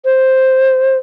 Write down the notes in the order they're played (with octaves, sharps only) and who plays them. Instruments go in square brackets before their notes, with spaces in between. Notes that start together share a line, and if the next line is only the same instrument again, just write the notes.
[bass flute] C5